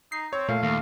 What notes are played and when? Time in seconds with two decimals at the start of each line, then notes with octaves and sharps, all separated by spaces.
0.12 D#4 C7
0.33 C4 C#5
0.49 A#2 A3 F5
0.63 D#2 F5